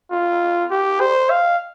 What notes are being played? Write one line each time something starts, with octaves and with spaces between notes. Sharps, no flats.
F4
G4
C5
F5